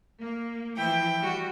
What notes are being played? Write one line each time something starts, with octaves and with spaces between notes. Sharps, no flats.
A#3
E3 F3 E4 G5
G3 F#4